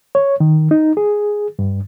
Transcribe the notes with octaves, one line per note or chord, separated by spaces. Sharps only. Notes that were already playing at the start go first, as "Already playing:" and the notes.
C#5
D#3
D#4
G#4
G2